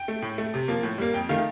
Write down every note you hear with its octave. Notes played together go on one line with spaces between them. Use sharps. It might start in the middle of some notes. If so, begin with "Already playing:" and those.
Already playing: G5
A3
A2
A3
C3
F3 A#3
A2
G3 A#3
F2 G5
D#3 A3 F5